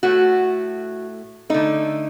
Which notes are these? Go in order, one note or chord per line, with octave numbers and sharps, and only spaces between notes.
A2 A3 F#4
D3 A3 D#4